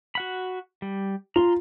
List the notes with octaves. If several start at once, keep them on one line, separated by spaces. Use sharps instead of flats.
F#4 F#5 B5
G3
F4 A#5 C6